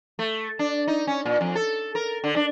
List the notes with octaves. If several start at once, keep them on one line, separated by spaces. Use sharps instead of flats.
A3
D4
D#4
C#4
A#2
F2
A4
A#4
D3
D4